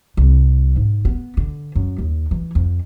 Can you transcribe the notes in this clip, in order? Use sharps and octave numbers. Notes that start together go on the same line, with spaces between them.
C2
G#2
B3
D3
F#2
D#2
E3
F2